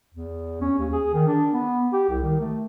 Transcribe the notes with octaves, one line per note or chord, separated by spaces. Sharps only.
E2
C#4
D#2
G#4
D#3
D4
B3
G4
C2
D#3
A3